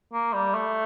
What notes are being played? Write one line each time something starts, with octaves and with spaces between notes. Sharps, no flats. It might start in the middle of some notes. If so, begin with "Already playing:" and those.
A#3
G3
A3